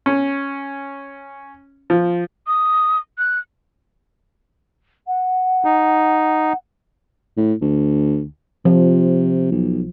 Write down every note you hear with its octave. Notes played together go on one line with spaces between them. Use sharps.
C#4
F3
D#6
F#6
F#5
D#4
A2
D2
C3 F3
B1